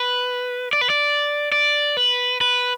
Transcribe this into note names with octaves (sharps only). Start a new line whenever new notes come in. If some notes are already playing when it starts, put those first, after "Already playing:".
Already playing: B4
D5
B4
D5
D5
B4
B4